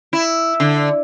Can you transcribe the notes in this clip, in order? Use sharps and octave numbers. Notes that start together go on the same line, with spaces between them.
E4
D3